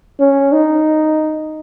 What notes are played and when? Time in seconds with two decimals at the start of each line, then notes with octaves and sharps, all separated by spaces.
0.19 C#4
0.52 D#4